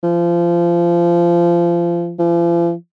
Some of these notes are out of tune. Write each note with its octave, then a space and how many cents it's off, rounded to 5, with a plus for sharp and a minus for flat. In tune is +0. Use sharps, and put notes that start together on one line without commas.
F3 -25
F3 -45